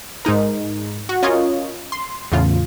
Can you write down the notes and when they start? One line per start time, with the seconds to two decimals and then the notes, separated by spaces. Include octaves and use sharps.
0.25 G#2 G#3 D#4 A#4
1.09 F#4
1.23 C#4 F4 A#4 C#5 D#5
1.92 C6
2.32 E2 A2 C#3 F4